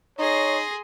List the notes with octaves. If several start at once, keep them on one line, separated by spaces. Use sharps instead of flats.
D#4 G#4 C#5 C6 A#6